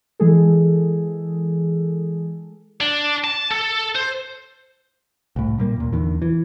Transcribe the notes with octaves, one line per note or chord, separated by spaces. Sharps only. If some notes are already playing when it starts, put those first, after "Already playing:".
E3 G#3 G#4 A4
D4
A5
A4
C5
C2 A2
A#2 G3 A#3
D#2 A#2
E2 D3 D#3
E3